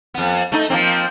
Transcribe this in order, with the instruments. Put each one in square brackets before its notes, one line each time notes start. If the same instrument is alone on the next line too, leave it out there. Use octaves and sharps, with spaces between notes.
[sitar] F2 B3
A3 D#4
F3 A#3 C4